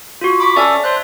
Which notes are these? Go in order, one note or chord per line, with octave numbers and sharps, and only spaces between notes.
F4 F#4
B5 C#6 D6
C#4 A4 D5 E5 A5
C5 C#5 E5 F#6